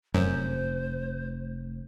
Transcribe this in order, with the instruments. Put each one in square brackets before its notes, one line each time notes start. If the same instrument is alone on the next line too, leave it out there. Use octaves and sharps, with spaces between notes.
[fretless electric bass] F1 [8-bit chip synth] F#2 [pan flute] C5